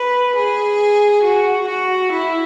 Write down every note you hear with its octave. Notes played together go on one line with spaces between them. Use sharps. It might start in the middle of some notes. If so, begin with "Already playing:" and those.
Already playing: B4
G#4
F#4
F#4
E4